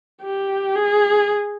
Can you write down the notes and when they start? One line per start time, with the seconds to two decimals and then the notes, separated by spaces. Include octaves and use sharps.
0.22 G4
0.76 G#4